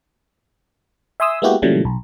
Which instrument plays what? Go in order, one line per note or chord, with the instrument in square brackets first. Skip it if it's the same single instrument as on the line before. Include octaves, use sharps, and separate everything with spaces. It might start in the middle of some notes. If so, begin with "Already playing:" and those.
[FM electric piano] E5 G#5 C6 D#6 E6
G#3 A#3 B3 E4 F#4 G4
A#2 C#3 E3 F#3 G3 A3
B1